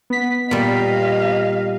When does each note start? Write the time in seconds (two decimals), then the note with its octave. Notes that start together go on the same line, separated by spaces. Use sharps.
0.10 B3 B6
0.51 A#2 G3 D#5 F5